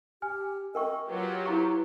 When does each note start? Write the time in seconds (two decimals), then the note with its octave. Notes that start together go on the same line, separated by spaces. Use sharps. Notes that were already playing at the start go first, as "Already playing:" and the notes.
0.22 G4 G#5 F6
0.75 A#4 D#5 G5 C#6
1.09 F#3 F4 G4 B4
1.46 E4 A#5 C#6